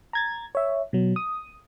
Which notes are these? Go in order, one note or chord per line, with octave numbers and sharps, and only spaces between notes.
A#5 G#6 A6
C#5 E5
B2 F#3
D#6